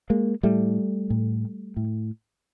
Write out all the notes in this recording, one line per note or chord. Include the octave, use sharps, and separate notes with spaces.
G#3 A#3
A2 G3 A3
A2
A2